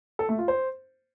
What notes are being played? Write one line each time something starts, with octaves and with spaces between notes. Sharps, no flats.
A4
A3
F4
C5